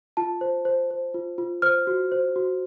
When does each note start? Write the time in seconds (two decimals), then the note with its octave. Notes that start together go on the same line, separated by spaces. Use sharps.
0.17 F4 A5
0.41 C5
0.65 C5
0.90 C5
1.14 F4
1.38 F4
1.62 C5 F6
1.87 F#4
2.12 C5
2.36 F#4